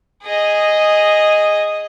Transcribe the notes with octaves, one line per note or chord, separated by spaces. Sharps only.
G#4 D#5